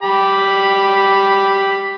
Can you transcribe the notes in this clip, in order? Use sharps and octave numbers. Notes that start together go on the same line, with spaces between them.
G4 B5